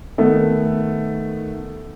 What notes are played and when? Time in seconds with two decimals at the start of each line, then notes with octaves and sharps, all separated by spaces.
0.18 D#3 A3 B3